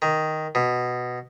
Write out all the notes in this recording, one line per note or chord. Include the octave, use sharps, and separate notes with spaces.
D#3
B2